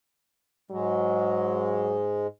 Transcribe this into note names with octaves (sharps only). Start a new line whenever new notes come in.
G#2 F#3 G#3